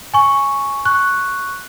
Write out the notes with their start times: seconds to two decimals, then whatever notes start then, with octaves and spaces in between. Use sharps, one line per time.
0.14 G#5 C#6
0.85 C#6 F#6